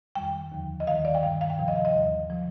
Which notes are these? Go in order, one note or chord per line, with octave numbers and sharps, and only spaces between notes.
F2 D#3 G3 G5
D#2 D3 F3
D#5
D#2 D#3 G3 F5
D5
G5
G2 D#3 G3 F5
F5
G5
D2 C3 F3
D#5
F5
D#5
D#2 D3 G3
C3 F3